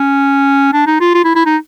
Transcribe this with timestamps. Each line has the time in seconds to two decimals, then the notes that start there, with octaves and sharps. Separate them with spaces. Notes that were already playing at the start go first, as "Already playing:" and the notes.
Already playing: C#4
0.73 D4
0.86 D#4
1.00 F4
1.14 F4
1.24 E4
1.35 E4
1.46 D#4